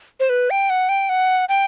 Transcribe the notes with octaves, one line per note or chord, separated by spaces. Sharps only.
C5
B4
G5
F#5
G5
F#5
G5